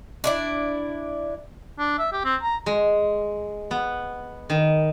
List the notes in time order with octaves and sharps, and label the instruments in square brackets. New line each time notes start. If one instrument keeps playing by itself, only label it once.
[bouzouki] D4 E4 D5
[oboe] D4
E5
G4
C4
A#5
[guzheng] G#3
B3
D#3